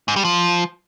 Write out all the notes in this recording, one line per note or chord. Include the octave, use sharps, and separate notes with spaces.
G#2
G3
F3